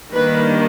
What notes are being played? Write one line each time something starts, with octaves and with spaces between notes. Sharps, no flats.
D#3 G3 A#3 D4 B4